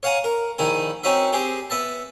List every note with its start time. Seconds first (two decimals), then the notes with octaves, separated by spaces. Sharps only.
0.03 C#5 F5 F#5 G#5 A#5
0.24 A#4
0.58 A#1 D#3 E4 G#5
1.03 C4 C#4 D#4 F#4 E5
1.33 C4 G4 G#4
1.70 B3 E5 A5